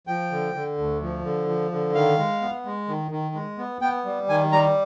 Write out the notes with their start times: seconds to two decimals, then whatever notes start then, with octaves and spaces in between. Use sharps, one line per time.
0.07 F3 G5
0.31 D3
0.54 D3
0.78 D2
1.02 F3
1.24 D3
1.48 F3
1.71 D3
1.94 D#3 F5
2.18 G#3
2.42 B3
2.65 G#3
2.88 D#3
3.11 D#3
3.35 G#3
3.58 B3
3.82 B3 G5
4.05 G3
4.29 D#3 G#5
4.52 G3 A#5